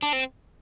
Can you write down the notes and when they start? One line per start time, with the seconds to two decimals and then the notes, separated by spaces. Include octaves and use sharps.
0.03 D4
0.13 C4